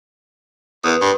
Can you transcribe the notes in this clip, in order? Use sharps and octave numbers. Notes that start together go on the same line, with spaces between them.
E2 A#4 B4 D#6
G2